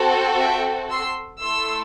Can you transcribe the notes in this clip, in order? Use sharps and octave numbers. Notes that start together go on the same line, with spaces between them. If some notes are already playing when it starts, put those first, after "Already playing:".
Already playing: C4 F#4 A4
E5 G5
C6 E6
A3 E4 A4 C6 E6